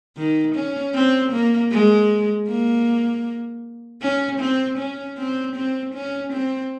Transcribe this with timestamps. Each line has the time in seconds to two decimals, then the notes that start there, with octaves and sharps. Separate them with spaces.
0.17 D#3
0.55 C#4
0.95 C4
1.32 A#3
1.71 G#3
2.48 A#3
4.02 C#4
4.40 C4
4.78 C#4
5.18 C4
5.56 C4
5.94 C#4
6.33 C4